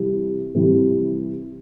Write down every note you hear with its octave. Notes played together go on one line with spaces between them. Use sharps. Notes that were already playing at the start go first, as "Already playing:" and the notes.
Already playing: C3 E3 G3
C3 E3 G3